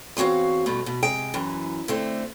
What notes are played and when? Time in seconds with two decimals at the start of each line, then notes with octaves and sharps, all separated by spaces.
0.17 E2 C4 F#4 C#5 F5
0.66 G2 B2 A3
0.86 B2
1.03 C3 G#3 G5
1.34 F#2 E3
1.88 D3 A3 C4